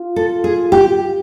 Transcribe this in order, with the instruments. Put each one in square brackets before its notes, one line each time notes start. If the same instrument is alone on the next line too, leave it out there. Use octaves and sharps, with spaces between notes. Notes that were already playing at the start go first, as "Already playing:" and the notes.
Already playing: [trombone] F4
[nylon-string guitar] A4
G#4
G4